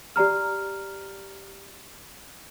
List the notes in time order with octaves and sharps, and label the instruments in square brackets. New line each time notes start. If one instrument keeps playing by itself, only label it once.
[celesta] G4 D5 A#5 F6